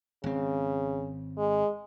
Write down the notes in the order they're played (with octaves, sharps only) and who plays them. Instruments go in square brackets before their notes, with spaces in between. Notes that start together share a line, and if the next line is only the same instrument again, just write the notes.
[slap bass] G#1 C4 [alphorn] C#3
[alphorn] G#3